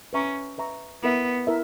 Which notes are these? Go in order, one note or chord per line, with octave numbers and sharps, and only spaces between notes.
C#4 B4 E5 A#5 C#6
B4 E5 A#5 C#6
B3 E4 A#4 E5
E4 A#4 E5